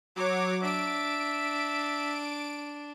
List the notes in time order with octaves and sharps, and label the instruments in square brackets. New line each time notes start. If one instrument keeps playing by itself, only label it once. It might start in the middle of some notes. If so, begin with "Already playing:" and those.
[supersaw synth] F#3 D6 [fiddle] C#5
[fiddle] D4 [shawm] E5 [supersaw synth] D7